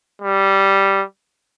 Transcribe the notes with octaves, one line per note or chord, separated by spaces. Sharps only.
G3